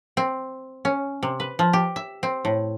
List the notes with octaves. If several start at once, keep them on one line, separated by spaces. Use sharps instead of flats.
C4
C#4
C3
B4
F3
G4
E5
C4
A2